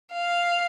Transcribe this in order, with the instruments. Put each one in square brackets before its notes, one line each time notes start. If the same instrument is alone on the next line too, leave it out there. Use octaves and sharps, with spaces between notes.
[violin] F5